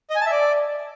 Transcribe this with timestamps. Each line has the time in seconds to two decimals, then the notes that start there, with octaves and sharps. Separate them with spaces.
0.10 D#5
0.16 G#5
0.21 A5
0.26 E5
0.31 D5